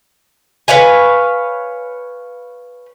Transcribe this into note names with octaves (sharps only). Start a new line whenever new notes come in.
B4 C#5 F5 G#5